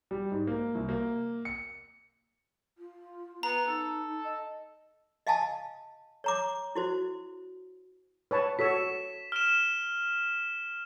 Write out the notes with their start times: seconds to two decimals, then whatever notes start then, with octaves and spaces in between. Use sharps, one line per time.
0.11 G3
0.32 G#2
0.47 A#3
0.75 C2
0.89 A#3
1.45 C#7
2.78 F4
3.43 B3 A#5
3.67 D#4 A4
4.24 D#5
5.27 D#5 F5 G#5 A5
6.24 C#5 A#5 D6
6.75 E4 F#4 C5
8.31 B4 C#5 A5
8.59 F#4 A4 C#5 B6 E7
9.32 F6 E7